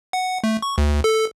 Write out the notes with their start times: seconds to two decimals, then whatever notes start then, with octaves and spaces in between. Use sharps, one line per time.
0.13 F#5
0.44 A3
0.62 C#6
0.78 D2
1.04 A4